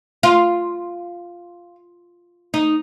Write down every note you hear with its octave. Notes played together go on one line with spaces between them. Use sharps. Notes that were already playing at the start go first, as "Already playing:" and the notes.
F4
D#4